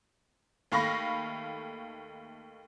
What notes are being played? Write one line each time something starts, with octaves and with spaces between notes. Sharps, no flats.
D#2 A3 F5 B5 C#6 A#6